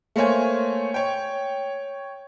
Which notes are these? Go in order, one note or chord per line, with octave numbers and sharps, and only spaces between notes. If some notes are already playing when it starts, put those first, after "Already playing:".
A3 A#3 C5 C#5 G#5
C#5 G5